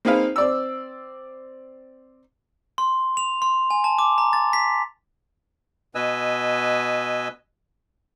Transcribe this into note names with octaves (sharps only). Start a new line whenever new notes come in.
A#3 C4 D#4 G#4 B4 F5
C4 D5 E6
C6
F7
C6
G#5
A5
D6
A#5
A6
B6
B2 B4 D#5 G#5 E6